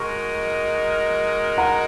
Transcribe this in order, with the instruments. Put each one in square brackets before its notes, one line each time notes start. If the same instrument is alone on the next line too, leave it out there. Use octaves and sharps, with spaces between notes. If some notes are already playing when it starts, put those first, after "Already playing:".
Already playing: [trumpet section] G#3 D#4 F#4 A#4 [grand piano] C#6
[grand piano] F#5 A#5